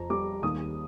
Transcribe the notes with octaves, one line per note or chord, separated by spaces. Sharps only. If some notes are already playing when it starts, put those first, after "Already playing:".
Already playing: F2 A#5
G3 D6
D#2 D#6